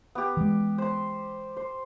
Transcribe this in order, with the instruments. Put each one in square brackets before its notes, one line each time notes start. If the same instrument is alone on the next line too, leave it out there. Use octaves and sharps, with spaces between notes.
[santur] B3 G4
[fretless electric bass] E3 G#3
[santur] C5 C6
C5